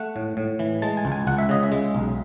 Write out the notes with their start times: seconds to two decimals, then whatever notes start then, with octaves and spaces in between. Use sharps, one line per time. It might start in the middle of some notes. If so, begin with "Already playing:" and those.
Already playing: A3 F#5
0.16 A2
0.37 A2
0.59 E3
0.82 G#3 A5
0.97 G#5
1.05 C#2
1.12 G#5
1.27 C#2 F#5
1.38 E5
1.49 C#3 D#5
1.63 E5
1.72 G#3
1.95 B1